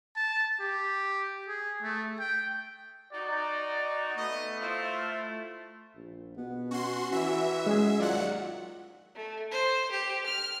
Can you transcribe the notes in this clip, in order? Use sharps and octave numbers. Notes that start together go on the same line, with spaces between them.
A5
G4
G#4
A3
G5
D#4 F#4 D5
A3 B3 D#5
E4 F4 C5
A#1
B2 B3
C#4 F#4 C6
E3 F#4 E5
G#3 C#4 G#4
D#2 F#3 F4 D5 F#5
A3
C5
G4
F6